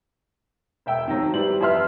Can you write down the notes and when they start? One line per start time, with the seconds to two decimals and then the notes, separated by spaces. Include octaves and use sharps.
0.86 E1 E5 G5 E6
1.08 D#3 F3 F#3
1.33 E3 G3 E4 C5 F#7
1.61 F2 E3 E5 C6 F6